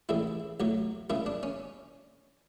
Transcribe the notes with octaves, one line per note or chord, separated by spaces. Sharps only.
A1 A2 G#3 E4
B1 A2 F#3
F#2 C#3 G#3 E4
D4
C#4